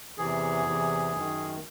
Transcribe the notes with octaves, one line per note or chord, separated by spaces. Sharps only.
E2 C3 E3 G#4
E2 C3 E3
F#2 D#3